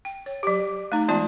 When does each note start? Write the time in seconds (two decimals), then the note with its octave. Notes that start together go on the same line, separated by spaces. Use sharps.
0.05 G5
0.26 C#5
0.43 F#3 G4
0.92 A3 D#4
1.08 E3 G#3 B3 F4 D5 A5